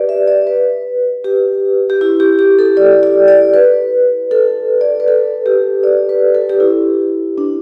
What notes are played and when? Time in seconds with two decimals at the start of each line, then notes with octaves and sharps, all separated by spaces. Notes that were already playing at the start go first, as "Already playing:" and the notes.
Already playing: G4 B4 D5
0.09 E5
0.28 D5
0.47 B4
1.24 G4
1.90 G4
2.01 E4
2.20 G4
2.39 G4
2.59 A4
2.77 D5
3.03 D5
3.28 D5
3.54 B4
4.31 A4
4.81 D5
5.00 B4
5.08 A4
5.46 G4
5.84 D5
6.09 B4
6.35 A4
6.49 G4
6.60 E4
7.38 D4